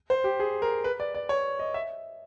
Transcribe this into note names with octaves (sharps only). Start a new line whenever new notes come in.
C5
G4
G#4
A#4
B4
D5
D5
C#5
D#5
E5